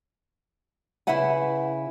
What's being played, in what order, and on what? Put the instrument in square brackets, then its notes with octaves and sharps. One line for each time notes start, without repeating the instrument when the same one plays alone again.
[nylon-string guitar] C#3 E4 B4 E5 F#5 G#5